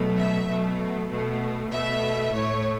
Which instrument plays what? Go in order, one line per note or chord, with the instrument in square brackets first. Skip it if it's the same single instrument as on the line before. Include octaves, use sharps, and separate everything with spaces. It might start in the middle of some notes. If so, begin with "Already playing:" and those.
Already playing: [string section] B2 F#3 A3
E5
B2 F#3 A3
B2 A3
B2 A3 E5
A2 A3 C#5